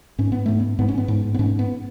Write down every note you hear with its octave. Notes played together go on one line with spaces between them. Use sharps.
G#2 C#4
B3
G#2 A3
B3
G#2 B3
C#4
B3
G#2
B3
G#2 C#4
B3